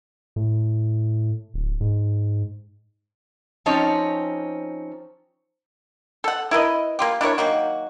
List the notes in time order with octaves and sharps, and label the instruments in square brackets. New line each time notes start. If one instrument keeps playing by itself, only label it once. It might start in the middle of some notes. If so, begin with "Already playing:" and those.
[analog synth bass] A2
D1
G#2
[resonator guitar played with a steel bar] F3 C4 C#4 D#4 C#5
[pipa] A4 F#5
E4 A#4 B4 D#5
A#3 F4 G4
D4 E4 A#4 C#5
D#3 F#3 A#3 F#4